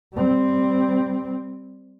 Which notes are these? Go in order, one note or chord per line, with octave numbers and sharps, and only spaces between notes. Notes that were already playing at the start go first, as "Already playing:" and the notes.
G3 C4